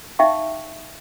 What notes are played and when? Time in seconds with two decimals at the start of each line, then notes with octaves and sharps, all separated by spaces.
0.19 D#4 E5 F5 G5 A5 C#6